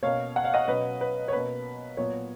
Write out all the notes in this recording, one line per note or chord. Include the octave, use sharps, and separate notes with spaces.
B2 A#3 C#4 C#5 F5
F#5
F5
D#5 F#5
B2 F#3 C#4 B4 D#5
B4
C#5
B2 A#3 C#4 B4
A#2 F#3 B3 C#5